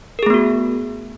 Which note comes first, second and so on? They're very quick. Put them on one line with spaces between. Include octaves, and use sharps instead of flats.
A#4 G#4 A3 B3 F#4